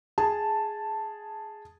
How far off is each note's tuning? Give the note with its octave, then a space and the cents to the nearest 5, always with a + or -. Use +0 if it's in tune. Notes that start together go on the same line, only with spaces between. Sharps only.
G#4 +0 A5 +0